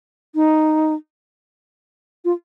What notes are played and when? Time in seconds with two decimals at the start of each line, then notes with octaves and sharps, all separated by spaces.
0.35 D#4
2.25 F4